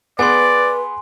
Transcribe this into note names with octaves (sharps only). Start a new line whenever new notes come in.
B3 G#4 B4 D5 G#5 C6